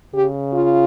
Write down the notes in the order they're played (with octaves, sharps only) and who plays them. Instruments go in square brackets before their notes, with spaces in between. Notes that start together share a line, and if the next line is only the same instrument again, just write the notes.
[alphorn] C#3 [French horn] G4
[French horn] F4